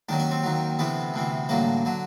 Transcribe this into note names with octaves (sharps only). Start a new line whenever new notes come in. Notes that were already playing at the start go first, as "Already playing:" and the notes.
D#2 D#3 F#3 D4
C#4
C4
D#2 D#3 F#3
D2 C3 E3 B3
D2 C3 E3
A1 G2 D3 F#3 A#3
D3 F#3